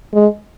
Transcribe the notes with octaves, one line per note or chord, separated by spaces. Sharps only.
G#3